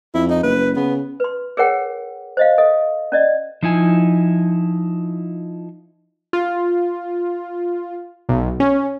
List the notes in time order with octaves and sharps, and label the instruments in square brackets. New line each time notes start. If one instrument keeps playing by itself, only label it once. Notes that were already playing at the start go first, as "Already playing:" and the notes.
[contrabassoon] F2 [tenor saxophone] E4
[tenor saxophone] D#4
[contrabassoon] F#1 [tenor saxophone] B4
[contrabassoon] C#3 [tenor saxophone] B3
[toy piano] B4 C6
G#4 A#4 C#5 F#5 G5
C5 D#5 F5
A4 D#5
C#4 D5 D#5
[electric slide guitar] F3 D#4 E4 G#5
[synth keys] F4
B1
C#4